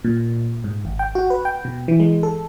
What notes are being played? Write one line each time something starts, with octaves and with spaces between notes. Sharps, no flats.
A#2
G#2
G#1
G5
F#4
B4
G5
B2
E3
G#3
A4